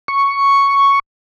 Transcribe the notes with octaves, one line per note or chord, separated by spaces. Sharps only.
C#6